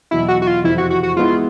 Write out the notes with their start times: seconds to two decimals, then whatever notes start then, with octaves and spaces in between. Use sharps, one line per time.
0.11 E2 B2 F#3 E4
0.28 F#4
0.42 F#4
0.47 F4
0.64 F2 C3 E3 E4
0.78 F#4
0.90 F#4
1.03 F#4
1.16 G#3 B3 E4 F4